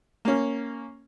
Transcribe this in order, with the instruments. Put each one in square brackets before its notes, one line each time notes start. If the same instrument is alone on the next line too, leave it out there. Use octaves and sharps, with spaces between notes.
[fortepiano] A#3 C#4